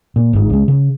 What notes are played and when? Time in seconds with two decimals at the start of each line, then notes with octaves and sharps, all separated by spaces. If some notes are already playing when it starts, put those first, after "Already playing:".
0.16 A#2
0.33 G1 G#2
0.50 C#2 G#3
0.68 C#3